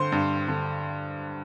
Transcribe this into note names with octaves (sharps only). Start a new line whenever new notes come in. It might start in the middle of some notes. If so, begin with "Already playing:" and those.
Already playing: G2 D3 C5 C6
G2
D3